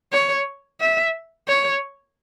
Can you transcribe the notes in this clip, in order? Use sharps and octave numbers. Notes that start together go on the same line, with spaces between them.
C#5
E5
C#5